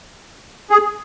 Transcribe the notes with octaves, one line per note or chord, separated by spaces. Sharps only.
G#4